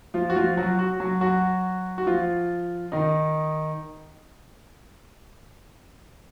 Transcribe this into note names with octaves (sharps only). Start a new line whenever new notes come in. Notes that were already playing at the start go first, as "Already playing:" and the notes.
F3 F4
F#4
F3 F4
F#3 F#4
F#4
F#3 F#4
F#3 F#4
F#4
F3 F4
D#3 D#4